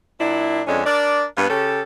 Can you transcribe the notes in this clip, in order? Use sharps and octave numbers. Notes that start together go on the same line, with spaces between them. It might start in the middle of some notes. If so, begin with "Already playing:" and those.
A#2 F#3 D4 E4
F2 D3 G#3 C#4 D4
D4 A#4 D5
G2 A#3 B3
C#3 C#4 G4 A4